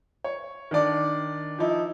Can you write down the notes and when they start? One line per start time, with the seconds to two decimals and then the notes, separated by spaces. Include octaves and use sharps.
0.24 C#5
0.71 D#3 D4 D5
1.59 F3 D#4 E4